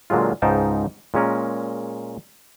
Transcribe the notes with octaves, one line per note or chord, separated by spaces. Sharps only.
A#2 D3 F#3 G#3 F4
C#2 G#2 D#4 F5 G5 A5
A#2 G#3 C#4 A#4